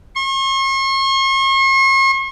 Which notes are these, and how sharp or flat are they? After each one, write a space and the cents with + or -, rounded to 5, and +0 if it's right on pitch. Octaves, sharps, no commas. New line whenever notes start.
C#6 -45